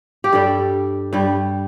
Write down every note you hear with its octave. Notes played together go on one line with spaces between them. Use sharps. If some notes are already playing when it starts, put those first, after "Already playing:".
G4
G2 G3 A4
G2 G3